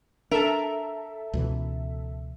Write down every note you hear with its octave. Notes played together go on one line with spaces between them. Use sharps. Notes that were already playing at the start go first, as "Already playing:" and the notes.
D4 A4 A#4 E5
C#2 B2 E3